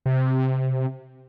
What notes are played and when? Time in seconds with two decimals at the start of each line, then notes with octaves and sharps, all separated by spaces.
0.06 C3